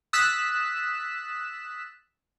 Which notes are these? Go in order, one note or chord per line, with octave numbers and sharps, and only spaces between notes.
D#6 E6 F#6 A6 B6 E7